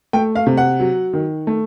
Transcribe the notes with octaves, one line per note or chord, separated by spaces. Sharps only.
A3 G5
F5
C3
F#5
F#3
D#3
A3